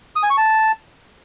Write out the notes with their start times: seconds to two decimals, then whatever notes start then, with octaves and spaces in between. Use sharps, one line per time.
0.16 D#6
0.23 G#5
0.30 C#6
0.37 A5